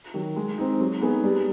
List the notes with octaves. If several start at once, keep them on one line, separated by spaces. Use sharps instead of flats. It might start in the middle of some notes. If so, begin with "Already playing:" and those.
D#3 F#3
G#3
C4 D#4
F#3
B3 D#4 G#4
G3